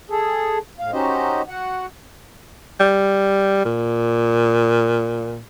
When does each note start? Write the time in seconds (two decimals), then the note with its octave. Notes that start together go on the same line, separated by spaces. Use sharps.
0.10 G#4 A4
0.79 A2 F5
0.92 C#4 D#4 F#4 G4 C5 D#5
1.48 F#4 F#5
2.80 G3
3.65 A#2